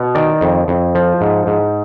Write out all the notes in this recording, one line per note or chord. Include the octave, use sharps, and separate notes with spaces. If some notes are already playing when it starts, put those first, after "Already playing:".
Already playing: B2
D#3 D5
F2
F2
F3
G#2
G#2